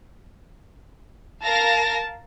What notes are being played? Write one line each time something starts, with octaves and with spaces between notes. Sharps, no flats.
A#4 F5 A5 A#6